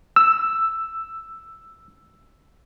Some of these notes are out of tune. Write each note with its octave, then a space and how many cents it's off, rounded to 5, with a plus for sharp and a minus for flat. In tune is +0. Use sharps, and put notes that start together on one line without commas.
E6 +5